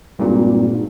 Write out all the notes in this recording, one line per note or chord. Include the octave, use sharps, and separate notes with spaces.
G#1 G2 A#2
G#2